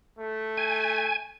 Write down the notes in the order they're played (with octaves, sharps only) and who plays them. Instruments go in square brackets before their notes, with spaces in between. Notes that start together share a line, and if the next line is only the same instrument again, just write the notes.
[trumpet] A3
[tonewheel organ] G#5